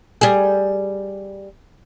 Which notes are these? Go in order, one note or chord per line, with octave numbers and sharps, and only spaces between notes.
G3 G#4